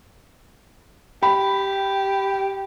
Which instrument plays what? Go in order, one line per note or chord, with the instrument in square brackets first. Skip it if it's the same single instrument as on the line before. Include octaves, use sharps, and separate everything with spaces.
[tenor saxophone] G4 [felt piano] B5